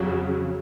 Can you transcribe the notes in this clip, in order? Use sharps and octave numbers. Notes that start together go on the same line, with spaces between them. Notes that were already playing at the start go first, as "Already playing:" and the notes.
Already playing: F2 C#3 F#3